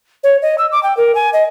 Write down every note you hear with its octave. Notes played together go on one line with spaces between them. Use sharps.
C#5
D#5
E6
D6
G5
A#4
G#5
D#5